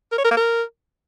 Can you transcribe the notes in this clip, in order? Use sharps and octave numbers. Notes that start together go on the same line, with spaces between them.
A#4
C#5
A#4
A#3
A#4